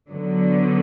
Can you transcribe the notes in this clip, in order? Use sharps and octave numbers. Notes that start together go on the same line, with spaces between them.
D3 F#3 B3